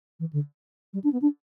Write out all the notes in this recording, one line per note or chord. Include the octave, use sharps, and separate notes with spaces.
E3
D3
G3
D4
B3
D4